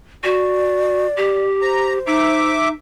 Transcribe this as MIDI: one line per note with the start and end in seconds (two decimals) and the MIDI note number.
0.24 1.07 66
0.24 1.43 74
1.17 1.98 67
1.62 2.53 72
1.62 1.93 82
2.07 2.73 63
2.07 2.68 76
2.07 2.68 86